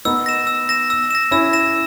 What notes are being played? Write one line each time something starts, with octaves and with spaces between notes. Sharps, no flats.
B3 D#4 E6
A#6 E7
E6
A#6 E7
E6
A#6 E7
C#4 E4 E6
A#6 E7